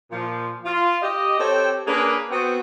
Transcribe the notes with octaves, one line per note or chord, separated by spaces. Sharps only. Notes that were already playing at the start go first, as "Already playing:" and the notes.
A#2 F3
F4
G4 D#5
C4 G4 A4 C#5 G5
A#3 C#4 D4 G#4 A#4 B4
B3 C4 F#4